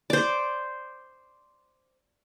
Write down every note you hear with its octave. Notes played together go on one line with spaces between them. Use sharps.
C5 D5